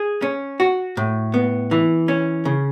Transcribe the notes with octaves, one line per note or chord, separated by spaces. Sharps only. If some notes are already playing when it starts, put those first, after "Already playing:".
Already playing: G#4
C#4
F#4
A2
B3
E3
C#4
C#3